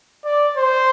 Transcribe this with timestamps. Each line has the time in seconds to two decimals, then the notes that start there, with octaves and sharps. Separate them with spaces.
0.24 D5
0.56 C5